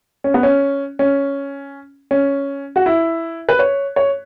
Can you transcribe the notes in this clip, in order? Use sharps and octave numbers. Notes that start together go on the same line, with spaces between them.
C#4
B3
C#4
C#4
C#4
F#4
E4
B4
C#5
C#5